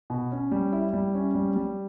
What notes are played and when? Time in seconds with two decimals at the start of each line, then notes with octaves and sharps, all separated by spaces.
0.10 B2
0.32 C#4
0.51 G3
0.73 E4
0.93 G3
1.14 C#4
1.35 G3
1.56 G3